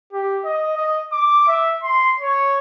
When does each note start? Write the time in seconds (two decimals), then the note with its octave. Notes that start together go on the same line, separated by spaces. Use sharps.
0.13 G4
0.45 D#5
0.77 D#5
1.12 D6
1.48 E5
1.83 C6
2.20 C#5